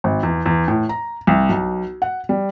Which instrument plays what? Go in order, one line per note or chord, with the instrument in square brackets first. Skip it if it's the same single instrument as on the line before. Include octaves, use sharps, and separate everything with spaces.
[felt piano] G#1
E2
E2
A2
A#5
C2
B1
F#5
G3